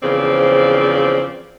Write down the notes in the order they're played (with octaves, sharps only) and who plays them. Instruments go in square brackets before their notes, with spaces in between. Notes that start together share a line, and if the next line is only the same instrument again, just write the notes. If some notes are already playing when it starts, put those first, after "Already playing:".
[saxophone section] E2 C#3 F3 C4 D5